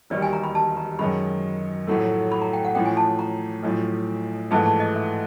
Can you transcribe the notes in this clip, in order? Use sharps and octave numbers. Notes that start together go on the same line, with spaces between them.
E1 D#2 D#3 G3 D5
G#5
A#5
B5
A5
A#5
F#2 D#3 G#3 B5
A#1 A2 F#3 A3
B5
A#5
G5
F#5
A1 A2 F3 G5
G#5
A5
A#5
B1 A2 F3
A#1 G#2 E3 A3 A5
A5
D#5
E5